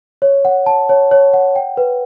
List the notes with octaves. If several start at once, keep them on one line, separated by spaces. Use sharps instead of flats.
C#5
F#5
A5
C#5
C#5
F#5
G5
B4